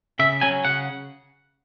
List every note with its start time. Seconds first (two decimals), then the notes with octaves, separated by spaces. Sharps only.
0.19 C#3 E5
0.41 F#3 C#4 G#5
0.65 C#3 F#5